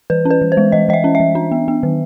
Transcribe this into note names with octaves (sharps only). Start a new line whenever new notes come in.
E3 B4
C#4
B4
E3
C5
G#3
E3 D#5
E3 D#5 E5
C#4
E5
E3
D4
B3
B3
D#3